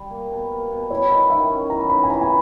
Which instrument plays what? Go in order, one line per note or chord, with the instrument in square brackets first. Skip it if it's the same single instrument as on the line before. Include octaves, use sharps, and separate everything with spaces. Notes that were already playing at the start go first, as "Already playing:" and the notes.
Already playing: [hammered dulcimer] G3
A#3
B2
A#3
B2
[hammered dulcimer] E4 [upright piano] C#5
[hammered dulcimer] E4 [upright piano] D#5
[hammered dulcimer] D#3 [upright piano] E5
[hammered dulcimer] C#4
[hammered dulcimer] E3 [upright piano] A#5
[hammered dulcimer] D#4 [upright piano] B5
[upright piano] G#5
[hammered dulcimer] E3 [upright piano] A#5
[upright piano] G#5